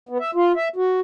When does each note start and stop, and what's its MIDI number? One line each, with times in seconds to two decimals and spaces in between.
0.09 0.18 59
0.20 0.31 76
0.35 0.52 65
0.56 0.68 76
0.76 1.00 66